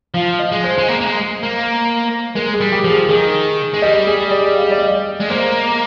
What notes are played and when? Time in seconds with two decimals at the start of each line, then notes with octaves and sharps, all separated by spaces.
0.14 F3 F5
0.39 D#5
0.52 G#3
0.64 C5
0.78 G#3
0.88 A#3
1.01 A#3
1.06 G#3
1.43 A#3
2.35 G#3 A#4
2.54 G#4
2.60 G3
2.72 G4
2.84 F3
2.90 G#4
3.09 D#3 G#4
3.74 G#3
3.82 G3 D#5
4.07 G#4
4.31 D5
4.56 F5
4.63 D#5
4.71 D5
4.78 D#5
5.21 G#3
5.29 A#3 C5